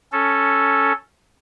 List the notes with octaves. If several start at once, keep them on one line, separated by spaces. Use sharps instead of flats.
C#4 A4